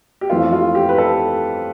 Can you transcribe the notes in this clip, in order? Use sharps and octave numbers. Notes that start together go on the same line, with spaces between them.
G4
F2 E3 A3 C4 F4
F4
G4
B4
A4